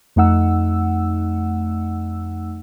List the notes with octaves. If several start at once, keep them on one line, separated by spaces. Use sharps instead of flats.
F2 A3 D#4 F#5 E6